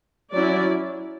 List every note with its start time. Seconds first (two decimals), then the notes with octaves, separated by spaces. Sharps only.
0.34 F#3 C#4 E4 D5